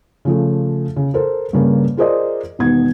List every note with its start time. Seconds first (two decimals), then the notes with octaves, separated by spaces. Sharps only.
0.25 C#3 F3 A3
0.96 C#3
1.14 A4 A#4 C5
1.53 G2 C#3 A#3
1.97 F4 G#4 A#4 C5 D5 D#5
2.59 E1 D#3 B3 G#6